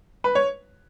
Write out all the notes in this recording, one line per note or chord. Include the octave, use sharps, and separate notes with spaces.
B4
C#5